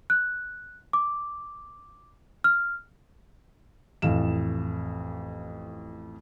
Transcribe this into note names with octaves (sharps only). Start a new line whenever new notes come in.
F#6
D6
F6
A1 F2 E3 F5 E7